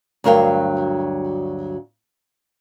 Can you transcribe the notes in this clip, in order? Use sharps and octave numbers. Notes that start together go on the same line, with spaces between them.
D2 G2 F#3 A#4 F5 G5